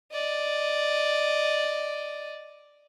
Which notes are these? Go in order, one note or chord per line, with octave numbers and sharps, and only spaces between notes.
D5 D#5